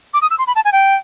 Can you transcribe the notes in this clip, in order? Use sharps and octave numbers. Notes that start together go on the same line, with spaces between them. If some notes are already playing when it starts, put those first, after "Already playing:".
D6
D#6
E6
C6
B5
A5
G#5
G5